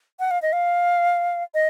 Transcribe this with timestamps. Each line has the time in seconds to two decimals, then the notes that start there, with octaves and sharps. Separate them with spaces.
0.20 F#5
0.31 F5
0.42 D#5
0.53 F5
1.54 D#5